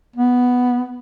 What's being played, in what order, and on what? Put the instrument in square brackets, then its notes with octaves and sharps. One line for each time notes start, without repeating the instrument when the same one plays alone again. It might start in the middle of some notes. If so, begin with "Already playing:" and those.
[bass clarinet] B3